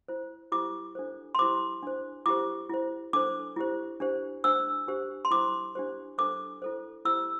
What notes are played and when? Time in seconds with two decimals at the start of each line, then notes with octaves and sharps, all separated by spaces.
0.08 E4 C5
0.52 E4 G4 C5 D6
0.95 D4 A4 C5
1.35 C6
1.39 E4 G4 C5 D6
1.83 D4 C5
2.26 E4 G4 C5 D6
2.70 E4 C5
3.13 D4 A4 C5 D6
3.56 E4 G4 C5
4.00 D4 G4 C5
4.44 D4 C5 E6
4.88 D4 G4 C5
5.25 C6
5.31 E4 C5 D6
5.75 D4 G4 C5
6.18 D4 A4 C5 D6
6.62 E4 A4 C5
7.05 E4 G4 C5 E6